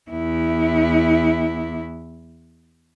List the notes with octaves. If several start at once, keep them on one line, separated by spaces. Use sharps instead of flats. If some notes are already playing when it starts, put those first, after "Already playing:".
E2 E4